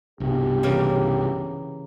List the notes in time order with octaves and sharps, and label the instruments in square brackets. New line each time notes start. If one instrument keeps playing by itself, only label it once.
[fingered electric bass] C2 G2 B2 [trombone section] G4
[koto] C#3 E3 A#3